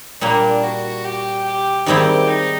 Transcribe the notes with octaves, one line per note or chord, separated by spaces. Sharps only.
A#2 G3 A#3 D4
F#4
G4
G4
G#2 D#3 G3 C4 E4 G4
D#4